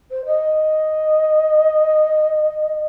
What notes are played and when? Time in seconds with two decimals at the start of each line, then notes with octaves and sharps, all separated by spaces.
0.11 C5
0.26 D#5